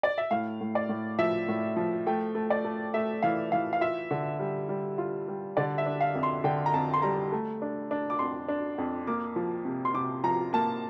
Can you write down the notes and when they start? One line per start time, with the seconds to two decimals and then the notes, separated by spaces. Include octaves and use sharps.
0.03 D5
0.18 E5
0.31 A2 F5
0.61 A2
0.75 D5
0.89 A2
1.18 F3 E5
1.48 A2
1.76 F3
2.06 A3 G5
2.35 A3
2.50 D5
2.64 A3
2.94 A3 E5
3.22 E3 F5
3.52 E3 F5
3.73 F5
3.81 F4 E5
4.11 D3
4.39 G3
4.69 G3
4.98 F4
5.28 G3
5.57 D3 D5
5.78 E5
5.86 D4
6.01 F5
6.15 F2
6.23 C6
6.44 D3 G5
6.66 A#5
6.74 F2 A5
6.94 C6
7.02 G3 A#5
7.32 A3
7.62 D4
7.91 D4
8.10 D6
8.19 F2 C6
8.48 D4
8.78 F2
9.07 A#3 D6
9.36 F3
9.65 C3
9.85 C6
9.94 C3 D6
10.23 F3 A#5
10.53 A#3 A5